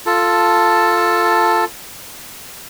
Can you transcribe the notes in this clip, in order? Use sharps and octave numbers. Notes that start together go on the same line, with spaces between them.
F4 A4 A5